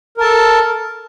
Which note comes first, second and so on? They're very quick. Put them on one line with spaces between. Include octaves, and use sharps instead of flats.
A#4 A5 A4